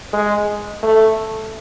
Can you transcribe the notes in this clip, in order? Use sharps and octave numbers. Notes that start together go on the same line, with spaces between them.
G#3
A3